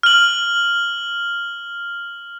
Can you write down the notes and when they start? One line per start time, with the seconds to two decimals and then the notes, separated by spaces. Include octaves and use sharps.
0.03 F6 F#7